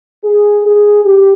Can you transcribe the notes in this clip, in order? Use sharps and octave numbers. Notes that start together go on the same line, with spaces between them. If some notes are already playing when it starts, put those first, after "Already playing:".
G#4
G#4
G4